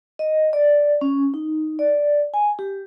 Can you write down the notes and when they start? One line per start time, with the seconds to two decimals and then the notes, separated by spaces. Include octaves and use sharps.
0.19 D#5
0.53 D5
1.01 C#4
1.34 D#4
1.79 D5
2.34 G#5
2.59 G4